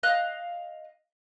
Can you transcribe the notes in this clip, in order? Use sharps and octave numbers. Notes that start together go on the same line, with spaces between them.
D#5 F5 F#6